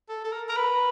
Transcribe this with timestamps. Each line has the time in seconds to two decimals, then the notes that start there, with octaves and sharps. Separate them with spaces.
0.09 A4
0.24 A4
0.32 A#4
0.49 A#4
0.57 B4